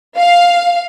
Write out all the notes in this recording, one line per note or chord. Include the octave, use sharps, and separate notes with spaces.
F5